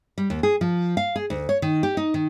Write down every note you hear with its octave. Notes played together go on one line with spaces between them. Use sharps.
G3
D#2
G#4
F3
F5
G#4
D2
C#5
D#3
G4
D#4
D#3